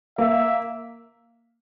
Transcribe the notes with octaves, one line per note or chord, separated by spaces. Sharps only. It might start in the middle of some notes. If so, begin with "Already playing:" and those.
A#3 E5